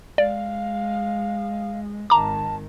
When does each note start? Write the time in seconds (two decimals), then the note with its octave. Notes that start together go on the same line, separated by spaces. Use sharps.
0.18 G#3 D5 F5
2.10 G#1 D#3 A5 A#5 D6